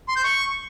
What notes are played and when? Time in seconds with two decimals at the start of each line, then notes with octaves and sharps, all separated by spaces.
0.08 C6
0.16 G6
0.24 C#6